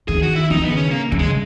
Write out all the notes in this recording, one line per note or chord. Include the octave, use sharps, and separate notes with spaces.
D#3 G#4
F#4
E4
D#3 D#4
B3
C#3
C#4
A#3
C#3
G#3